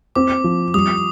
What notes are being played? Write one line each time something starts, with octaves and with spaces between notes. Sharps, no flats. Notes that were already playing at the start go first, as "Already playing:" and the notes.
C4 D6
F3
G3 D#6